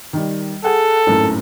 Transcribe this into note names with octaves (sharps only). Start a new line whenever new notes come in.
D#3 G3
G#4 A4 F#5
G#1 F#2 A2